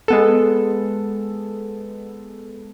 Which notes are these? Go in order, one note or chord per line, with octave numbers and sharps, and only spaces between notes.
G#3 B3 A4